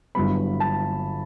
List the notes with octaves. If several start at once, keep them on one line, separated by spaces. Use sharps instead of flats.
G1 G2 F#3 B3 E4 B5
A5